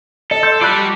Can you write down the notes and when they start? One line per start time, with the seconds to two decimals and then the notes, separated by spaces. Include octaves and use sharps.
0.31 A4 D#5
0.43 C6 E6 G6
0.61 F4 G4 D5 B5 F#6
0.76 F#4